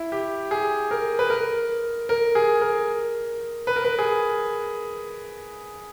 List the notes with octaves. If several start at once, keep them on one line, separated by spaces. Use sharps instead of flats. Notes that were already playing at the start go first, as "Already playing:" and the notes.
Already playing: E4
G4
G#4
A#4
B4
A#4
A#4
G#4
A#4
B4
A#4
B4
G#4